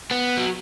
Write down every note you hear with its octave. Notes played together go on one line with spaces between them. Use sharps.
B3
F#3